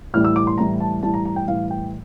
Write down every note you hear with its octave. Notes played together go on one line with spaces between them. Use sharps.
A2 E3 G3 F6
E6
D6
C6
A2 E3 G3 A#5
A5
A2 E3 G3 A5
A#5
A#5
G5
A2 E3 G3 F5
G5